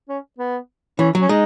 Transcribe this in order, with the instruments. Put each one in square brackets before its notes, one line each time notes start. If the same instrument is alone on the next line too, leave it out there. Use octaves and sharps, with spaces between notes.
[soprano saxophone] C#4
B3
[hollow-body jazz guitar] E3 [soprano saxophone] C#4
[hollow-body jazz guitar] F#3
[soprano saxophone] C#4
[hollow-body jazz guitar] G#3 [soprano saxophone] D#4